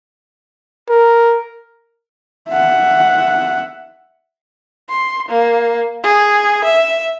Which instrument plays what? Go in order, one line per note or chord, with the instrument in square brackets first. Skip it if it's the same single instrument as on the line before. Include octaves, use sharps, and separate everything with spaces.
[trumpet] A#4
[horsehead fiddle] E5 F#5
[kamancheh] C6
A#3
G#4
E5